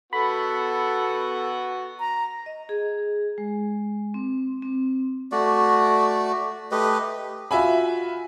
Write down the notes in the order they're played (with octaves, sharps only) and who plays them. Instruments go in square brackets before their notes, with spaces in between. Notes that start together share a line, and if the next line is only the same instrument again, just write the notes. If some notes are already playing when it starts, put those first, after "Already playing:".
[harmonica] B3 F#4 [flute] A4 [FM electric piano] B5
[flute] A#5
[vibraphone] D#5
G#4
G#3
C4
C4
[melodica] A3 F#4 D5
A3 G4 B4 D#5
[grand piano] F4 F#4 E5 G#5 B5